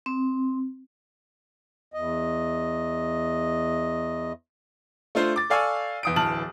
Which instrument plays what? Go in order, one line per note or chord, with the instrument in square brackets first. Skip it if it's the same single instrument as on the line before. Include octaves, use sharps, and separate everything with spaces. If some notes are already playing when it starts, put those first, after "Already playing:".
[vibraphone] C4
[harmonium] E2 D#5
[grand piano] A3 D4 F4 C5
D6 A6
A4 D5 F5 G#5 C#6 E6
E2 D#6 D7
D1 E3 A5 F6 F#7